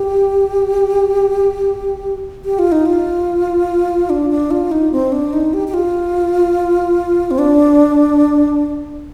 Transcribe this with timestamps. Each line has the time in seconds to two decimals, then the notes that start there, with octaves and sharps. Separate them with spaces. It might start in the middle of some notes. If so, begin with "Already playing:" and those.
Already playing: G4
2.45 G4
2.59 F4
2.72 D#4
2.86 F4
4.10 D4
4.30 D4
4.51 F4
4.72 D#4
4.92 C4
5.12 D4
5.33 D#4
5.54 G4
5.68 G4
5.74 F4
7.31 C4
7.39 D4